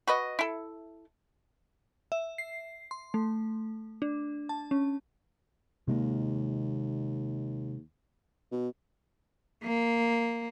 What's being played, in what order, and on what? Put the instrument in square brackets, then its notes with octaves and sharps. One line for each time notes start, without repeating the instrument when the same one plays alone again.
[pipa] F#4 B4 D#5
E4 A4
[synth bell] E5
C7
C6
A3
D4
A5
C#4
[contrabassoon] D#2 [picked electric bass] C3 G#3 A#3
[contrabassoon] B2
[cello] A#3